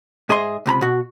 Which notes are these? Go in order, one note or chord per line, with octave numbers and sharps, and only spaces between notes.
G#2 G#4 D#5 E5 C6
C#2 C3 A#5 B5
B2 F#4